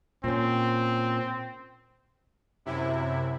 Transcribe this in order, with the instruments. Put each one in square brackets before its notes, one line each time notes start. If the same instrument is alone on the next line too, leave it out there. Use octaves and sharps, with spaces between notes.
[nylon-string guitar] A#2 C#4 [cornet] C4
[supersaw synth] F#2 C3 E4